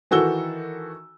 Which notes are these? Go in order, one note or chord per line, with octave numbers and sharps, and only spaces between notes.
D#3 E3 F#4 A4 E6 G7